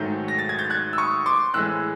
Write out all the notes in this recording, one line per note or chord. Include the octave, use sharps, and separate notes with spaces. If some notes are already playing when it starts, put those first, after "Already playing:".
Already playing: G#2 D#3 F#3 A3 G6
A#6
A6
G#6
G6 A6
F#6 G#6
E6
C#6 D#6
C6 D6
A2 E3 G#3 E6 F#6